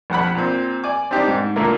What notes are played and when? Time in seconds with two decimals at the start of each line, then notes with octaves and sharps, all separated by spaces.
0.10 A#1 F2 F#5 B5
0.35 A#2 C4
0.84 D5 G#5 D6
1.11 C4 D4 D#4 G4
1.28 G#2
1.56 A#2 D3 A3 A#3